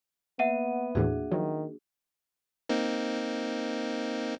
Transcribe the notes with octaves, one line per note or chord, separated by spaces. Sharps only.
A#3 B3 E5 F#5 D#7
D#2 A2 E3 D4 F#4 G#4
D#3 F3 F#3
A#3 C4 D#4